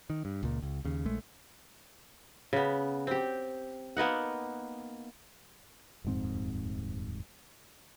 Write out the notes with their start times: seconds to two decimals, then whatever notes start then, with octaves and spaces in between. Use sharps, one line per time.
0.10 D#3
0.25 G2
0.43 C#2 A#2
0.62 C#2
0.85 D#2 C#3
1.05 A#1 G#3 A3
2.53 C#3 B3
3.07 C4 G4
3.97 A#3 B3 D#4 F#5
6.04 D#1 F2 G#2 C4